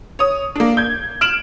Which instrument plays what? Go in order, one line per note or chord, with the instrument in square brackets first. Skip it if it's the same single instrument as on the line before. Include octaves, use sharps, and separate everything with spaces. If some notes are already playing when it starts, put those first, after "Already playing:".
[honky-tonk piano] C#5 D#6
A#3 D4
G6 G#6
F6 D7 E7 F#7